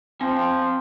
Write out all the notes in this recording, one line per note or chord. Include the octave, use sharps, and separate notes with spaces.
F3 C4 G#5